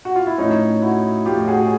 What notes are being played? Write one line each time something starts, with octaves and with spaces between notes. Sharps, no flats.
F#4
F4
E4
A2 F3 C#4 D#4
E4 F#4
A2 F3 F4 G4
F#4 G#4
G#4